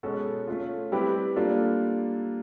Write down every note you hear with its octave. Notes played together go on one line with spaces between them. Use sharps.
B2 G#3 C#4 F#4 A4
A3 C#4 F4
G3 C4 E4 G4 B4
G3 A#3 D4 F4 A4